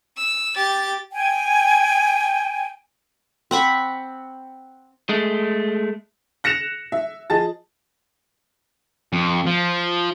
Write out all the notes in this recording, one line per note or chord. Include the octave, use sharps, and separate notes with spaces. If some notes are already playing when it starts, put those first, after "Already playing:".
E6
G4 A6
G5 G#5
C4 F#5 B5 C#6
G#3 A3
F#6 A#6 C#7 E7 F7
E5
F3 G#4 D#5 A5 A6
F2
F3